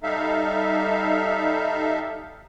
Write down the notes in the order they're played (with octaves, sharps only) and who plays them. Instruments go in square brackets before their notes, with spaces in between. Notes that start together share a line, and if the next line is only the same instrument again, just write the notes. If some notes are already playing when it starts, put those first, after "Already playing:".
[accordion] G3 D#4 A4 E5 F5